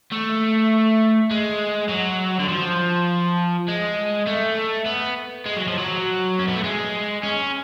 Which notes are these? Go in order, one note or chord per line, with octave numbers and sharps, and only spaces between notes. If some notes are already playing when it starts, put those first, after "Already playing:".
A3
G#3
F#3
D3
F3
G#3
A3
B3
G#3
F#3
F3
F#3
C#4
B3
A3
G#3
C#4